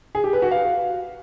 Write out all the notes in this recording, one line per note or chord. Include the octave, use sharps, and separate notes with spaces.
G#4
G4
B4
F#4
F5